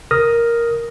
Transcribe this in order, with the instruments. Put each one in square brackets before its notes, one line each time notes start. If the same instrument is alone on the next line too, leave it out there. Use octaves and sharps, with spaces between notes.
[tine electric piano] A#4 D#6 F6 A#6